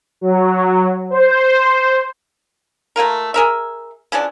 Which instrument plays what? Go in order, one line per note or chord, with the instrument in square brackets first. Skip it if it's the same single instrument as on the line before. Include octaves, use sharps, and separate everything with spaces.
[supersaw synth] F#3
C5
[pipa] A3 A#3 F4 A#4
G#4 A#4 E5
C#3 E3 F3 D4